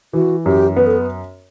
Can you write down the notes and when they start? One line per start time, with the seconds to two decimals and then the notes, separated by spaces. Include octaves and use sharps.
0.13 E3 F#4
0.45 F#2 G4
0.76 B3 B4
0.87 A4